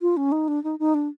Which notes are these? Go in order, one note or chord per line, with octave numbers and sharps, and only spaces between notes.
F4
C#4
D#4
D4
D#4
D#4
D4